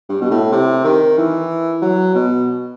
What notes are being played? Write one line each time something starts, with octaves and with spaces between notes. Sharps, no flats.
G2
B2
A2
C3
D#3
E3
F#3
B2